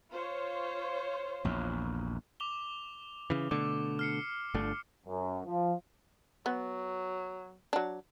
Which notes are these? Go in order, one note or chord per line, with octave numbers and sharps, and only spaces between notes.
F4 C5 C#5
A#1 E2
D6 F7 G7
C#3 E3
B2 D3 A3 D6
F6 C7 C#7
G1 D3 A3
F#2
F3
F#3 B3
F#3 D4